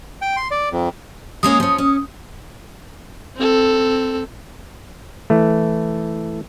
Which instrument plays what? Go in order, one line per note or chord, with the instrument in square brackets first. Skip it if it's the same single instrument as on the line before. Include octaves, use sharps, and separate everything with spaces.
[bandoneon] G5
C6
D5
F2
[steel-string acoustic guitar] G#3 A#3 C#4 [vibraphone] D#6
[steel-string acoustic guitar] F3 C#4
C#4
[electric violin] C4 A4
[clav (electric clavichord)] E3 A3